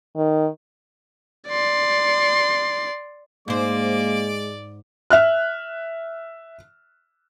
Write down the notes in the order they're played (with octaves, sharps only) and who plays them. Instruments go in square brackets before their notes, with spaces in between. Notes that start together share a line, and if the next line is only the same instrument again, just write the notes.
[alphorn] D#3
[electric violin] D5 C6
[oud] G#2 C5 [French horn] G#3 [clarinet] A#3 [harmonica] D5 D6
[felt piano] E5 F6 F#6